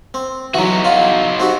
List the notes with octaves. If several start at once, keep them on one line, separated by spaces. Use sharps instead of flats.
C4
E3 F#3 D#4 F#4
F4
C4 F#4 G4